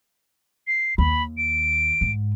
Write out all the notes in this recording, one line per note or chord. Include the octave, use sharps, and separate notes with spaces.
C7
D#2 B5
D7
G#2